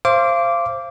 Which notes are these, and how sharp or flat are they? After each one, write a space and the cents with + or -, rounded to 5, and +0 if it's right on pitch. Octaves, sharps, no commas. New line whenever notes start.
C5 +20 F5 -30 D6 -10